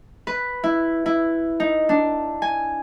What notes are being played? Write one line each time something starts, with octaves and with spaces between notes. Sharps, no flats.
B4
E4
E4
D#4
D4
G#5